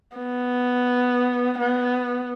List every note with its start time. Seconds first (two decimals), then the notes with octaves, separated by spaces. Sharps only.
0.17 B3
1.58 B3